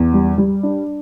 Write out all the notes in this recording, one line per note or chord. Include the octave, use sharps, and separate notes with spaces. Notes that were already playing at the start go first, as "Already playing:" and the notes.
Already playing: E2
G3
G3
D4